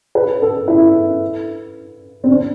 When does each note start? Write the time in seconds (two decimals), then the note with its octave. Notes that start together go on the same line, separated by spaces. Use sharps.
0.15 B4
0.42 A4
0.68 E4
2.24 C4
2.29 D4